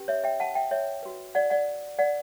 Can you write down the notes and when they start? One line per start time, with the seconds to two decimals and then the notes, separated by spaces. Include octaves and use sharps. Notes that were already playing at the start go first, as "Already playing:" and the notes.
Already playing: C#4 G4 B4
0.08 C#5 E5
0.24 E5 G5
0.40 F#5 A5
0.55 E5 G5
0.71 C#5 E5
1.03 F#4 B4
1.35 D5 F#5
1.50 D5 F#5
1.99 D5 F#5